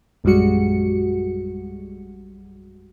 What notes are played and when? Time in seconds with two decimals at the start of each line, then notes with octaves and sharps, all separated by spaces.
0.24 A#1 F#2 G3 G#3 F#4 C#7